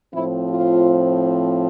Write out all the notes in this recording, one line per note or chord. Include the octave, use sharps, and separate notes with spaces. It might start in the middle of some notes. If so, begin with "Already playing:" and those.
A2 F3 C4 E4
F4